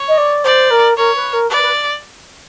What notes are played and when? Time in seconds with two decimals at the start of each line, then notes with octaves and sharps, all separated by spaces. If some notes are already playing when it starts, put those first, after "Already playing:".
Already playing: C#5
0.08 D#5
0.17 D5
0.44 C5 D5
0.70 A#4
0.97 A#4 C#5
1.15 B4
1.33 A#4
1.50 B4 D5
1.62 B4